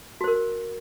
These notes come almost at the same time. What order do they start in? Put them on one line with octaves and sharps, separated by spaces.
F#4 C5 A#4